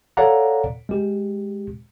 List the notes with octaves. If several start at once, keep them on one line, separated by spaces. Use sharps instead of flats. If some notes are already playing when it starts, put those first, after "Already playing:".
A4 C#5 D5 F5 F#5 A#5
G#3 G4